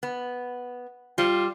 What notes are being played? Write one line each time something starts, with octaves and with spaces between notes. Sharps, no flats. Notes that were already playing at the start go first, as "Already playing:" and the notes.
B3
G3 F4